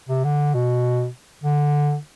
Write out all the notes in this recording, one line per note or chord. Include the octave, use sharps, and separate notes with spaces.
C3
D3
B2
D3